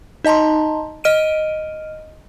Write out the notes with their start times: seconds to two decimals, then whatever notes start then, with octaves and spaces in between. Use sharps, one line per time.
0.24 D#4 D#5 A5 A#5 C6
1.04 D#5 F6 D7 D#7